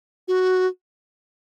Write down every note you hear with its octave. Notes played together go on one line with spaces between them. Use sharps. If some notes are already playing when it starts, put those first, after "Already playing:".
F#4